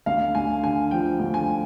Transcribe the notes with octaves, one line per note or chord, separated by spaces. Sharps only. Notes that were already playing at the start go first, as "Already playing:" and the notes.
D2 F5
D2 G#5
D3 G#5
F3 G5
D2
G#5